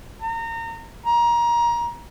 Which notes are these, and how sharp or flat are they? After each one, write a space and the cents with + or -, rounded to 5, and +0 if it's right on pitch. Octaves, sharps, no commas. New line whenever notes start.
A#5 -30
A#5 +25